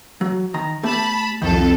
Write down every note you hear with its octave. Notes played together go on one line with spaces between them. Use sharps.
F#3
D#3 A#5
A3 B3 G4 A5 B5
C2 F2 D#3 A4